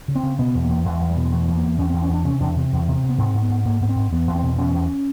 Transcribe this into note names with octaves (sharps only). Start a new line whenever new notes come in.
C#3
C4
C#3
B2 B3
E2
A#3
E2
E2 G#3
E2
G3
B2
G#3
E2 A3
E2
A#3
E2
E2 C#4
C4
E2
C#4
E2 D4
C3 C#4
E2 D4
C3
E2
C3
C3
B3
G#2 C4
G#2
B3
G#2
G#2 A#3
G#2 B3
C4
G#2
E2 B3
E2
C4
B2
E2 C#4
E2